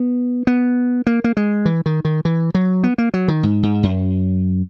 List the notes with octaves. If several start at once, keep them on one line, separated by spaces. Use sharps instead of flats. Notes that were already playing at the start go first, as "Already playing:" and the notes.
Already playing: B3
B3
A#3
A#3
G#3
E3
D#3
D#3
E3
F#3
B3
A#3
F#3
D#3
G#2
G#2
F#2